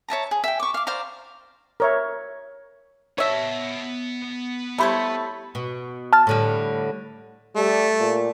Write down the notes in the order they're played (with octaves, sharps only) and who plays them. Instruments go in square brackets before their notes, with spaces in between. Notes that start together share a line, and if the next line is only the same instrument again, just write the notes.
[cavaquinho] C#5 E5 A5 A#5
G#4
E5 G5
C#6 D6
F5 D6
C5 D5 F5 A#5
[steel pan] A#4 C#5 E5
[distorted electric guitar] B3 A5 [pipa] C#5 E5
[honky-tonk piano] G3 B5 [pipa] A3 [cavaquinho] E4 C5 C#5
[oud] B2
[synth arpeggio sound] A5 F6 A6
[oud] A2 D3 G3
[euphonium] G3 [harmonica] A3
[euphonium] A#2